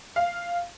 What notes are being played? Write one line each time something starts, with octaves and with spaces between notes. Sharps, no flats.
F5